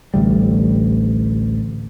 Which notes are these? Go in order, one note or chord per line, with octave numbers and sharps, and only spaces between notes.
A1 D2 G3